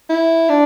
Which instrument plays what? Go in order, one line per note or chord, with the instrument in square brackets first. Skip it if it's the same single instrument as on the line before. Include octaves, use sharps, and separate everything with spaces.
[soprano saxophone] E4
D4